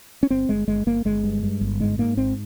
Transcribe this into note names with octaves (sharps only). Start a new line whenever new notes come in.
C#4
G1 C4
G1 G#3
G1 G#3
G1 A#3
G1 G#3
G2
G2
G1
G#2 G#3
G#2 A#3
G#1 C4